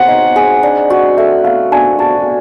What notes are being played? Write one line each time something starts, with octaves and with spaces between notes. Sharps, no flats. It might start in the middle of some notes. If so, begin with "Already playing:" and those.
Already playing: C4 G#4 C#5 F#5
D#4
G#4
D4
F#4
A3
A3 F5
D4 G#5
F#4 A5